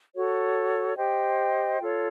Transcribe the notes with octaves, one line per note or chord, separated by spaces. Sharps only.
F#4 A4 C#5
G4 C5 D#5 G5
F4 A4 C#5